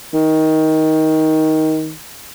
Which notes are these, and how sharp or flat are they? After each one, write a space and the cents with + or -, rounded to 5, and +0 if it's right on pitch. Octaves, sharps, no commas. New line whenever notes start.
D#3 +15